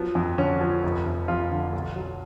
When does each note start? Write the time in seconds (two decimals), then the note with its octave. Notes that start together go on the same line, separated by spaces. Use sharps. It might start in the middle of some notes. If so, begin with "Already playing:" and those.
Already playing: F3 F#3 B3
0.15 F2
0.38 D3 C#4
0.61 F3
0.84 F1
1.06 F1
1.28 F2 F4
1.51 D3
1.73 B1
1.96 F#3